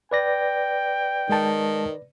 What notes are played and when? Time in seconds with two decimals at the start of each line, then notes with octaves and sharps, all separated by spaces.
0.11 B4 D5 G5 A#6
1.29 D#3 G#3 A5